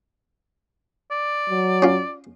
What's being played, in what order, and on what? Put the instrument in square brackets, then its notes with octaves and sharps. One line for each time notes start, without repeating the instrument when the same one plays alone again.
[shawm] D5
[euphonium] F#3
[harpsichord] C#4 F4